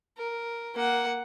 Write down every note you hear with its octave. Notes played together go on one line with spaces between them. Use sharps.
A#4
A#3 F#5